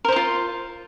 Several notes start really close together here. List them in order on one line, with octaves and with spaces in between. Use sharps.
A#4 C5 D#4 F4